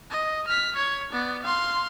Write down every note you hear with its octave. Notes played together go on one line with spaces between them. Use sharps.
D#5
F6 B6
C#5 G#6
B3 D5
F5 C6